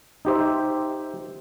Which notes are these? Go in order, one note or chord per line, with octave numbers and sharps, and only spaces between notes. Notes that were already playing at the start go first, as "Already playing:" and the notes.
D#4 G4 C5 E5